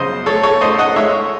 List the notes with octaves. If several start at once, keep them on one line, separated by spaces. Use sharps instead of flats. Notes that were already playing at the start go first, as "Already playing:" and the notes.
Already playing: F#2 C#3 C5 D#5
A3 A4 C#5
A4 C#5
A3 C5 D#5
D#5 F#5
G#3 C#5 E5